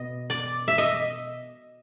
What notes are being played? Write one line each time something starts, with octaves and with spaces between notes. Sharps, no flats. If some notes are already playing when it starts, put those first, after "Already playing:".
Already playing: B2 D#5
D5
E5
D#5